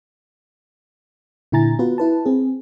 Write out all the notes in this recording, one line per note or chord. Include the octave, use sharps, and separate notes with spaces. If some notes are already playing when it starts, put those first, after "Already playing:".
A#2 D3 E4 G#5 A#5 A6
B3 F4 F#4 B4
E4 B4 A5
C4 G#4